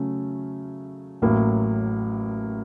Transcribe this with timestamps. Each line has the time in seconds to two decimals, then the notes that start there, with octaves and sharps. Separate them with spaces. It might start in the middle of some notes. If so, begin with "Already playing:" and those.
Already playing: C#3 F#3 A3 C#4
1.22 A1 A2 F#3 A#3